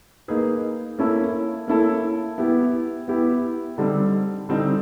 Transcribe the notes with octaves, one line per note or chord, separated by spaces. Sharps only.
A#3 D#4 G#4 B4
A#3 C#4 E4 A4
A#3 C#4 E4 A4
B3 E4 G4
B3 E4 G4
D3 G3 C4 D#4
D3 G3 C4 D#4